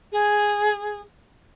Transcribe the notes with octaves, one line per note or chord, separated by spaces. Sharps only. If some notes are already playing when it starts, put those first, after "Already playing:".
G#4